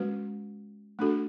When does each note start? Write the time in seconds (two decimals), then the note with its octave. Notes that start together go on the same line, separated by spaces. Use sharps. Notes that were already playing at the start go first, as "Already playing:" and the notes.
Already playing: G#3 C#4 F#4 B4
0.99 A3 D4 F#4 A4